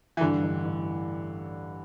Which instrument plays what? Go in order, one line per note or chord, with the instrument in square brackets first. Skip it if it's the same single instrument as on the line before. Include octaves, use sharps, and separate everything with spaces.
[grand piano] E3
[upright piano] G2 [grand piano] D3
[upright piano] A1
A1